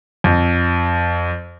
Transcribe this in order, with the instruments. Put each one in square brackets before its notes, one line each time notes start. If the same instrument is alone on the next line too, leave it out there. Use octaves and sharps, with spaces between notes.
[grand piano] F2